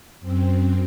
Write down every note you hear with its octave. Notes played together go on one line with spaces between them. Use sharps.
F#2 C4